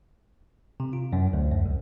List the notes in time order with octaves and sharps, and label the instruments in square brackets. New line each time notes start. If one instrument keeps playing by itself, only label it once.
[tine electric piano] C3
F4
F#2
D2
F#2
C2